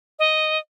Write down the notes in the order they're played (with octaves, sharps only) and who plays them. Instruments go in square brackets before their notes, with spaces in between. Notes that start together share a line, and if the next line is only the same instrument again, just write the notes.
[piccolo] D#5